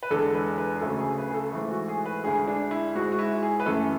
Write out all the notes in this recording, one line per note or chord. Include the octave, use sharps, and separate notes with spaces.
B4
E2 D3 G#3 A4
B4
B4
G#4
D2 C#3 F#3 A3 A4
G#4
B4
G#4
A4
G#2 E3 A3
F#4
G#4
B4
D2 D3 G#3 G#4
D4
E4
G#2 G#3 F#4
F#4
E4
G#4
B4
F#2 E3 A3 A4